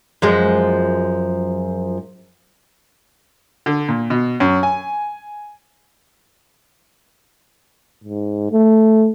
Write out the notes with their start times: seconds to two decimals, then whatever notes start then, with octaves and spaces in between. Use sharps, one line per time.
0.22 F#2 F3 G#3
3.66 D3
3.88 A#2
4.10 B2
4.40 F#2
4.63 G#5
8.04 G#2
8.51 A3